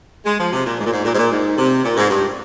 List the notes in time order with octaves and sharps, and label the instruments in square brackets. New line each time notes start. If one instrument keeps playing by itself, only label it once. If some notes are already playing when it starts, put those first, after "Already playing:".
[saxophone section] G#3
F3
C3
A#2
G#2
A#2
G#2
A#2
G#2
A#2
G#2
C3
A#2
G#2
G2